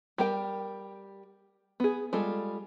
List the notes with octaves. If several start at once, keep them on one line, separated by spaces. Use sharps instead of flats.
G3 G4 A#4 G5
B3 G#4
G3 G#3 F4 A4